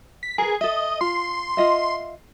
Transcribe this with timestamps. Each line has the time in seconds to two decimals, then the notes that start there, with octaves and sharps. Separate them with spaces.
0.23 B6
0.38 G#4 A#4 B4
0.61 A4 D#5 E5
1.01 F4 C6
1.57 F4 D#5 E5